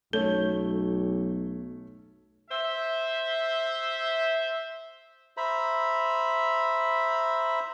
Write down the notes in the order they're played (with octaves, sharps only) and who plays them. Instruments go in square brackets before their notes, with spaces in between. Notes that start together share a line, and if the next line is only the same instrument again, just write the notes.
[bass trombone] B1 [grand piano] A3 C#4 C#5 [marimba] A4
[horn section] C5 E5
[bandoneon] C5 E5 A#5 B5